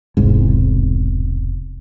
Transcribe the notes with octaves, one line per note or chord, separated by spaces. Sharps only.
E1 C2 G#2